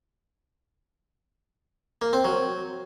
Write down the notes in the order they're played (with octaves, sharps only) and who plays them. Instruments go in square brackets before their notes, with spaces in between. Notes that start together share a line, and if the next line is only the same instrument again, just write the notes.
[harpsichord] A#3
C4
F#3